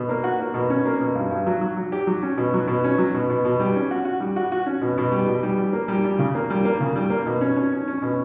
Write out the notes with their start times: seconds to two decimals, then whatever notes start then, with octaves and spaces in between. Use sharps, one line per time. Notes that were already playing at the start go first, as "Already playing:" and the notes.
Already playing: B2
0.09 A#3
0.24 F#4
0.39 A#3
0.54 B2
0.70 C#4
0.86 A#3
1.01 B2
1.15 G2
1.31 G2
1.47 F#3
1.61 F#3
1.77 F#3
1.92 G4
2.07 F#3
2.22 C#4
2.38 B2
2.54 F#3
2.68 B2
2.84 C#4
2.98 F#3
3.14 B2
3.30 B2
3.45 B2
3.60 G3
3.75 C#4
3.91 F#4
4.05 F#4
4.20 G3
4.36 F#4
4.52 F#4
4.66 C#4
4.82 B2
4.98 B2
5.12 G3
5.27 B2
5.43 G3
5.58 G3
5.73 A#3
5.88 G3
6.05 G3
6.19 C#3
6.35 A#3
6.50 G3
6.65 A#3
6.80 C#3
6.95 G3
7.10 A#3
7.26 B2
7.41 C#4
7.56 C#4
7.72 C#4
7.88 C#4
8.02 B2